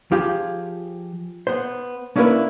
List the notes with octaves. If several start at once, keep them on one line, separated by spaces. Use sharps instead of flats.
F3 F4 G4 G#4
B3 C5
A#3 C#4 D4 E4 A#4 B4